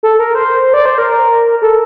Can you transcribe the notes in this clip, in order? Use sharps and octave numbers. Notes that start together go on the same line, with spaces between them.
A4
A#4
C5
D5
C5
A#4
A4